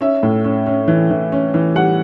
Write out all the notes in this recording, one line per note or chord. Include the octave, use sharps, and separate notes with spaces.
C#4 E5
A2
C#4
C#4
E3
E3
C#4
E3
G3 F#5